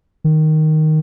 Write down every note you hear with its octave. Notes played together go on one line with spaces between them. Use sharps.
D#3